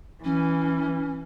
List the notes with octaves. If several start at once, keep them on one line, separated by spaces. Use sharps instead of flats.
E3 C#4